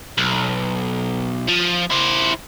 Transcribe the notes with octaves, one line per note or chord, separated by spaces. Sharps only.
B1
F3
E4 C5